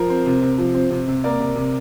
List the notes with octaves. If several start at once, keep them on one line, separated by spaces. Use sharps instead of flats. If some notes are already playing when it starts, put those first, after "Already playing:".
Already playing: F3 A#4
C4
C3
C3
F3
C4
C3
C3
A#3 A#4 D5
C3
C3